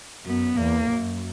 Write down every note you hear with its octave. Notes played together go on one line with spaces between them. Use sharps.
F#2 B3
E2 A#3
F#2